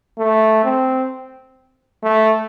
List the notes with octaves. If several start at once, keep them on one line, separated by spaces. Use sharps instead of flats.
A3
C4
A3